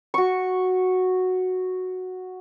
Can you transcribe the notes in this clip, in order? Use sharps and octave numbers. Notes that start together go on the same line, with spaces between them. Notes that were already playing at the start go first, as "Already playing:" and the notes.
F#4 C#6